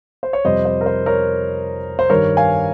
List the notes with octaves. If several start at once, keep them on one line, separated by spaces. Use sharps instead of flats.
C5
C#5
F2 C3 G3 C5 D#5
C5
A#4
C5
A#4 C#5
C5
G2 D#3 G3 A#4 C#5
F5 G#5